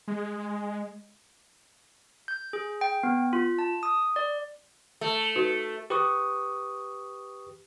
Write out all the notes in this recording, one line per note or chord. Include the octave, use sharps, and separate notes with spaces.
G#3
G6
G#4
G5
B3
F4
A5
D#6
D5
A3
D#4 F#4 B4
G4 B4 C#6 D#6